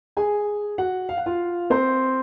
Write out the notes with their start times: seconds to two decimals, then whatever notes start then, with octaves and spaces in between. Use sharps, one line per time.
0.17 G#4 G#5
0.78 F#4 F#5
1.09 F5
1.17 F#5
1.26 F4 F5
1.70 C4 C5